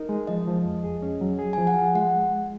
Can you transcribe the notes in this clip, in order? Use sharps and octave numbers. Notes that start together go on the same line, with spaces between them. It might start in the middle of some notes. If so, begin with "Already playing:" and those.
Already playing: D#4 A#4
G#3
F3 D#5
F3
F2
G#4
C#4
F#3
G#4
G#5
F3
F#5
F4
G#3 F#5